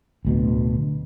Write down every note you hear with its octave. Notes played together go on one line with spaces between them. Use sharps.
D1 D2 B2